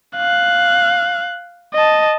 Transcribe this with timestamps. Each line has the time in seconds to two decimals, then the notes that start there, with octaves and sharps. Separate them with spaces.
0.17 F5 F#6
1.75 D#5 A5